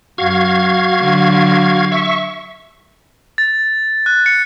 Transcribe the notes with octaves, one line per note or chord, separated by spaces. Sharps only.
F#2 F#4 F5 G#6
D3 F#3
E5 C#6
A6
F#6
C#7